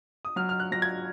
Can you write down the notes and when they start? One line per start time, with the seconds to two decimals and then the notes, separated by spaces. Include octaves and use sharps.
0.25 D#6
0.36 F#3 F6
0.49 F6
0.60 F#6
0.72 F#3 A#6
0.82 G#6